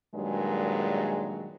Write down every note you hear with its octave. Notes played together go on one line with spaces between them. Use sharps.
G2 A#2 D#3 F#3 G#3